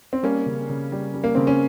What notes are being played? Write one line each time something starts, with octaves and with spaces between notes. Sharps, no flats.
C4
G3 A#3 C#4
C#3
C#3
G3
G3
A#3
C#3 C4
C#4